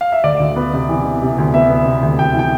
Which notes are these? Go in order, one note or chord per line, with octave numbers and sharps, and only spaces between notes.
F5
E5
D2 D5
D2
B3
C3
E3
C3
C3
D2
B3 E5
B3
C3
D2
D2 G5
E3
G5